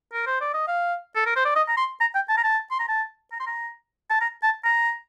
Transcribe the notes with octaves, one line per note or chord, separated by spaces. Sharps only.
A#4
C5
D5
D#5
F5
A4
A#4
C5
D5
D#5
A#5
C6
A#5
G5
A5
A#5
A5
C6
A#5
A5
A#5
C6
A#5
A5
A#5
A5
A#5